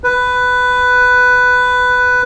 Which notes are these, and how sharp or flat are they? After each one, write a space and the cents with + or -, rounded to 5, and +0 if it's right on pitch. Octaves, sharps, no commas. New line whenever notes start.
B4 +10